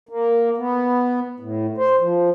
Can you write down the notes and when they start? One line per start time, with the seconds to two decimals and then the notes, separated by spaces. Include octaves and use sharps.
0.09 A#3
0.57 B3
1.40 A2
1.78 C5
2.00 F3